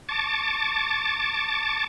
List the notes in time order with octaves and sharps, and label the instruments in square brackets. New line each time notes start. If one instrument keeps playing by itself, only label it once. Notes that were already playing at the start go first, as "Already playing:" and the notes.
[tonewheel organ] A5 C#6 D6 A6